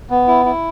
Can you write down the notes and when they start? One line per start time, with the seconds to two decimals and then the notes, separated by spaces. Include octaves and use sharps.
0.10 B3
0.28 E4
0.45 E4